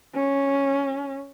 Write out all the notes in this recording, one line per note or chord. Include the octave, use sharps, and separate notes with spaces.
C#4